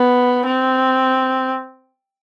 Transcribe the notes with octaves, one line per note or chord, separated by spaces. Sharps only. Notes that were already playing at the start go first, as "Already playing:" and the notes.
Already playing: B3
C4